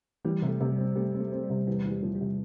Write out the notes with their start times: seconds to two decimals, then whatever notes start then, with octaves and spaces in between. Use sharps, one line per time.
0.25 E3 G3
0.42 C3
0.48 A3
0.60 C3
0.72 G3
0.78 C4
0.95 G3 A3
1.14 C4
1.20 A3
1.32 C4
1.43 G3
1.50 C3
1.67 E2 G3
1.85 E2
1.91 G3
2.02 F3
2.15 G3
2.21 C3